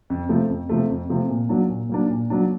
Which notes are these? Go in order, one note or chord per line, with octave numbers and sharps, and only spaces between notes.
F2
C3 F3 A3
F2
C3 F3 A3
F2
C3 F3 A3
A#2
F#3 A#3 D4
A#2
F#3 A#3 D4
A#2
F#3 A#3 D4